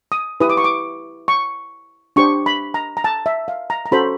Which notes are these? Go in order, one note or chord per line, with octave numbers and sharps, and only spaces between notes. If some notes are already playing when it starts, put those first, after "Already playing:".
D#6
E4 G4 B4 D#6
D6
C#6
D6
C#6
D4 G4 C5 C#6
B5
A#5
A#5
A5
E5
F5
A#5
A#5
C#4 F#4 A4 C5 B5